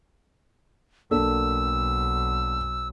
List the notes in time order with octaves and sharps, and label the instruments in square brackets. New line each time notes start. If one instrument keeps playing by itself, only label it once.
[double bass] B1 [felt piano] A#3 D4 A4 [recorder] E6